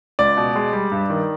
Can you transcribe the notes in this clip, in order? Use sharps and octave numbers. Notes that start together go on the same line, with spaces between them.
C#2 D5
B2
G#3
G3
G2
D#3